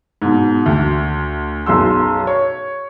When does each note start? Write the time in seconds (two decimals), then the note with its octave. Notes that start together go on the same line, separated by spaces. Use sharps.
0.22 G#2 B2
0.66 D2
1.66 B1 F#2 G#4 C6 E6
2.27 C#5